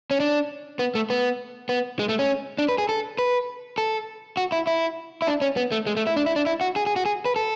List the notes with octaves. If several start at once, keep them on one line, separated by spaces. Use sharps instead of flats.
C#4
D4
B3
A3
B3
B3
G#3
A3
C#4
D4
B4
G#4
A4
B4
A4
F#4
E4
E4
E4
D4
C#4
B3
A3
G#3
A3
E4
D4
E4
D4
E4
F#4
G#4
G#4
F#4
G#4
B4
A4